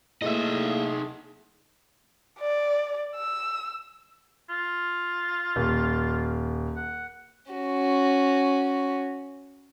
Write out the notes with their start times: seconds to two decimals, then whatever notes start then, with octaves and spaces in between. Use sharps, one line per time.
0.22 A3 A#3 D#4 E4 G#4 A4 D#5 E5
2.39 D5
3.16 E6
4.50 F4
5.56 D#1
6.76 F#5
7.51 C#4 F#4